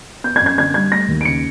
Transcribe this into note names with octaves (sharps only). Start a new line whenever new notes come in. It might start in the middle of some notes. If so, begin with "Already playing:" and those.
B3 G6
G#6
F#2
G#6
D3 G#6
G3 G#6
A3 A#6
D#2
D7
C#3 C#7